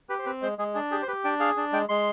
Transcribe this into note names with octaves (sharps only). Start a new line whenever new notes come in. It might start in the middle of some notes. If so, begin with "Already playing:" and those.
G4 B4
C5
C4 B4
G#3 C5
G#3 G#4
D4 G#4
G4 G#4
C5
G4 B4
D4 G5
G#4 F5
D4
G#3 G5
G#3 C6